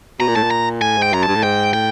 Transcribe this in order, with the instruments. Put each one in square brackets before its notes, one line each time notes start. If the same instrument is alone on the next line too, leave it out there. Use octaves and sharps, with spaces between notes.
[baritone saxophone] B2 [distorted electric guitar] A#5
[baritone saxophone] A#2
[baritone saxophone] A2 [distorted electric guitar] A5
[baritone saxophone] A#2
[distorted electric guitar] A#5
[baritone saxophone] A2 [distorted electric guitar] G#5
[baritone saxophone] G#2 [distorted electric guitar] G5
[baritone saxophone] F#2 [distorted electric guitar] A#5
[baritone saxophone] G2 [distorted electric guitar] A5
[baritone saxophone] A2
[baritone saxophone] G#2 [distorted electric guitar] G5
[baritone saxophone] A2 [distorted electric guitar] G5